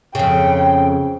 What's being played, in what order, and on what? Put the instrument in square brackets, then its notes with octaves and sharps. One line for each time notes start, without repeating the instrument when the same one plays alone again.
[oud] F2 C#3 [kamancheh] G5